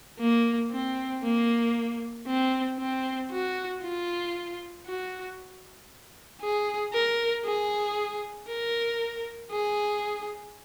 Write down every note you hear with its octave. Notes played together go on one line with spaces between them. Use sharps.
A#3
C4
A#3
C4
C4
F#4
F4
F#4
G#4
A#4
G#4
A#4
G#4